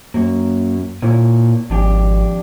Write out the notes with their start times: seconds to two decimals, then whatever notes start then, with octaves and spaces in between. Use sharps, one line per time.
0.14 F#2 A#3 C#5
1.02 A#2 A#3 E4 C#5
1.70 G#1 F2 D4 G4